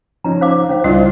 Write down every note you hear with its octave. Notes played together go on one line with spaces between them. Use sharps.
F3 C#4 D#4 A#5
C5 F5 D6
C#4 C5 F5
C#2 G3 D4 E4 F4 C5